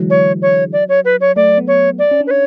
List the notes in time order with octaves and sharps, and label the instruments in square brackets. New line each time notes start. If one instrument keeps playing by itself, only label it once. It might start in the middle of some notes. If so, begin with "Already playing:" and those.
Already playing: [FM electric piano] D3 E3 F#3 G#3
[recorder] C#5
C#5
D5
C#5
B4
C#5
[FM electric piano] A3 [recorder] D5
[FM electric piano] B3
[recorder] C#5
D5
[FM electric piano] C#4
D4
[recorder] B4
C#5